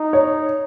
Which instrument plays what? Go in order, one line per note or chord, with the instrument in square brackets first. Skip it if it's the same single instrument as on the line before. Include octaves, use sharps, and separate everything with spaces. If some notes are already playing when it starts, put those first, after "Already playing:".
Already playing: [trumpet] D#4
[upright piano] C#5